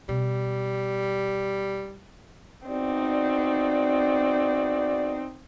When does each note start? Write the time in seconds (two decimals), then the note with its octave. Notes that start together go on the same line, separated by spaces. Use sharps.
0.09 B2 G3
2.68 E2 C4 D#4 F#4 D5